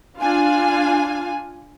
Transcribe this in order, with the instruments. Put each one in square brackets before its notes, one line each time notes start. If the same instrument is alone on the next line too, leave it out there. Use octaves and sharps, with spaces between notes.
[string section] D4 F4 F5 G#5